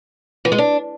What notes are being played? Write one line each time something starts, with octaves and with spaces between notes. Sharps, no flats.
E3
G#3
D4